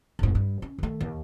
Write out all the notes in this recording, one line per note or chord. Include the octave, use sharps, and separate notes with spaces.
F1 G#2
G2
C#4
D#3 A3
D#2